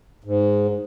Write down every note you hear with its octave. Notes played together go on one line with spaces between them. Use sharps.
G#2